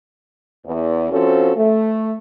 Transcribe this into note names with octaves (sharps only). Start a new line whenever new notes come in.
E2
F3 C4 C#4 F#4 A4
A3